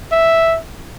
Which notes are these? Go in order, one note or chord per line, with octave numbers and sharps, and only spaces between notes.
E5